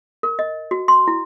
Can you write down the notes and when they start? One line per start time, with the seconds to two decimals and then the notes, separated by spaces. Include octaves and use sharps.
0.23 A#4
0.39 D#5
0.71 F#4
0.88 C6
1.08 E4